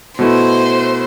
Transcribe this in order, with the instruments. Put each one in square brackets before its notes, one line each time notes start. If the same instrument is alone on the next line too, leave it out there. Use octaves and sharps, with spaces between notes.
[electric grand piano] B2 A3 E4 [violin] C5